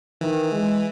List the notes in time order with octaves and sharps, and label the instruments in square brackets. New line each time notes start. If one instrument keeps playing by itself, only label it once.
[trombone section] D#3 [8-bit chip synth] E3
[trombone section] G#3